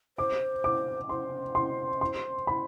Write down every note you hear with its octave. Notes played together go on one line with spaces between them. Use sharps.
C5 D6
D6
C5 C6
C6
C6
B5